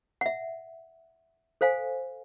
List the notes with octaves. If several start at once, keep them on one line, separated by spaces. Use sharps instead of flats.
E5 F#5
A4 C5 F5 G#5